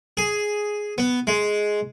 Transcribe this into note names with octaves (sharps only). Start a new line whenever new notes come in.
G#4
B3
G#3